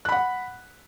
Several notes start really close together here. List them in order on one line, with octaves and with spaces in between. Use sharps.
F#6 B5 F#5